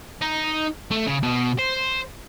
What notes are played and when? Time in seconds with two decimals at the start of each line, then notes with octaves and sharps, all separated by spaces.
0.21 D#4
0.91 A3
1.07 C#3
1.23 B2
1.59 C5